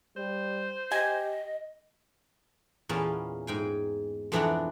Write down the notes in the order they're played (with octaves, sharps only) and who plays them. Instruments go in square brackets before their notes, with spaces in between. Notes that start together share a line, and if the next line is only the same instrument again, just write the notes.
[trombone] G3 [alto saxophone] C5
[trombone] G4 [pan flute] D#5 [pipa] G#5
[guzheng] E2 A#2 A#3 B3 C#4 A5
G#2 G5 G#5
F2 B2 E3 D4 F#5 A#5